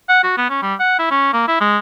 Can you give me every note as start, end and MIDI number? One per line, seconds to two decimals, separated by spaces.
0.09 0.19 78
0.23 0.36 66
0.37 0.47 59
0.50 0.59 61
0.62 0.75 55
0.80 0.98 78
0.99 1.07 64
1.11 1.31 61
1.33 1.44 58
1.48 1.59 64
1.60 1.78 56